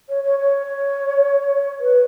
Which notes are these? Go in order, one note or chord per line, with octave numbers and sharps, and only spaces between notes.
C#5
C#5
C#5
B4